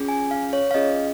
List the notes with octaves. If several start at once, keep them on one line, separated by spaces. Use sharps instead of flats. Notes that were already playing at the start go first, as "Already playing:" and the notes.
Already playing: C#4 F4 G#4
G#5
F5
C#5
F5
C#4 F4 G#4 D#5